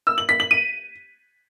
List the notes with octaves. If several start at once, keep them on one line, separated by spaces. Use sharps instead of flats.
E6
F#7
B6
F#7
D#7